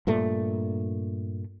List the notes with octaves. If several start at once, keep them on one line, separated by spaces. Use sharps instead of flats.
G2 A#2 A3